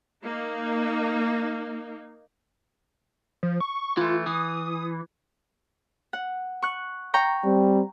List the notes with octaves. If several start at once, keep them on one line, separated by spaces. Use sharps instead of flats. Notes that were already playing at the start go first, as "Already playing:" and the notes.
A#3 D#4
F3
C#6
E3 A3 F4
E3 D#6
F#5
C#6 F#6
G5 A#5 C#6
G3 C4